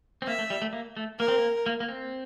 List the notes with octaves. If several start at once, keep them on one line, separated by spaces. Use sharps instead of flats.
C4
A#3 E5
A3
G3
A3
A#3
A3
A#3 A#4
C4
A#3
A#3
A#3
C4